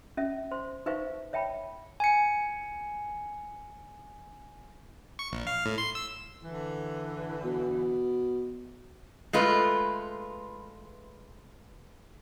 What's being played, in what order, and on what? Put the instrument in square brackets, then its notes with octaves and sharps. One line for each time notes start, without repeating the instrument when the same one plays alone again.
[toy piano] C#4 E5
C5 C6
D#4 B4 C5 E5 F5 C#6
C#5 E5 G5 A5 B5
[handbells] G#5 C#7
[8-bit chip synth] C#6
A#1
F5
A2
C6
E6
[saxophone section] D3 E3
[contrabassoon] B2
[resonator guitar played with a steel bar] G#3 A3 F4 B4